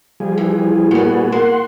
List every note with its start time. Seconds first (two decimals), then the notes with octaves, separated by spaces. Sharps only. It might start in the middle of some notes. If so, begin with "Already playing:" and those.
0.20 F3 G3 G#4
0.38 E3
0.91 A#2 G3 B3 F#4 G#4
1.32 A#3 F#5 C6